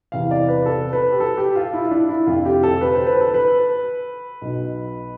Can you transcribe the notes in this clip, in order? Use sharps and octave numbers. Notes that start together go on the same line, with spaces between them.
E2 C3 E3 F5
D5
B4
A4
B4
G4
A4
G4
F4
E4
E4
D4
E4
F1 F2 D3 F4
G4
A4
B4
C5
B4
A4
B4
B1 B2